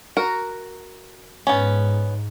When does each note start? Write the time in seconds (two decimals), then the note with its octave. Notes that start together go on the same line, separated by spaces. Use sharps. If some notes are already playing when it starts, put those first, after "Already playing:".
0.17 F#4 A#4
1.47 G#2 B3 C#4